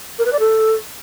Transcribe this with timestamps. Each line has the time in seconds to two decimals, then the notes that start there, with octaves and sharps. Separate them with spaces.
0.18 A#4
0.25 B4
0.32 D5
0.39 A4